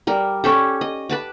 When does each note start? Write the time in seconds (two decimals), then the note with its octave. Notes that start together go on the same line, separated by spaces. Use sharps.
0.07 G3 A#4
0.44 C#4 G4 A4
0.81 D#5
1.09 B4 A5 D6